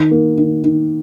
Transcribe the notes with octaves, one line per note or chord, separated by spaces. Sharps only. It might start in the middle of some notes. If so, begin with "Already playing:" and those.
Already playing: D#3
A#3
D#3
D#3